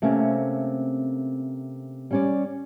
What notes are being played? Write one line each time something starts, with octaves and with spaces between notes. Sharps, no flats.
C3 A3 A#3 C4 C#4
G3 C#4 D5